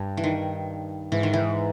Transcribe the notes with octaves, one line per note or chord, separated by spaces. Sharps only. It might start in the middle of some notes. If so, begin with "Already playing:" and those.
Already playing: G2
E3
D#3
G#2 E3
D#3
E3